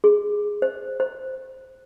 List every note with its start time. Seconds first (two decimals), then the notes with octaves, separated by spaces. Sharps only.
0.04 G#4
0.62 C5
1.00 C5